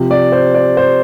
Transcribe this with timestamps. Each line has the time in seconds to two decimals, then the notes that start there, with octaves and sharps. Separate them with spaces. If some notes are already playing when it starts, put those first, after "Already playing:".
Already playing: C3 F3
0.11 D5
0.32 C5
0.54 D5
0.77 C5